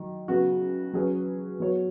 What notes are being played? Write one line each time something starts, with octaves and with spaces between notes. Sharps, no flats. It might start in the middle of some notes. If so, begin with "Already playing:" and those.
Already playing: D#3 F#3
C#3 F#3 B3 F#4
F#3 C#4 G#4 B4
F#3 B3 F#4 C#5